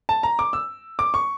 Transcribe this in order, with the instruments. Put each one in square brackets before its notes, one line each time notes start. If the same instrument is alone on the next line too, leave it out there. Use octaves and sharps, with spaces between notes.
[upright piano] A5
A#5
D6
E6
D6
C#6